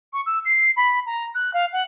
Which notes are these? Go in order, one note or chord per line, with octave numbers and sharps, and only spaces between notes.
C#6
E6
C7
B5
A#5
F#6
F5
F#5